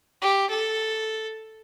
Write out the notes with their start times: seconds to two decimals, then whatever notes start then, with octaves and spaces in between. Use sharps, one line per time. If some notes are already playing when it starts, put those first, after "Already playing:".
0.22 G4
0.50 A4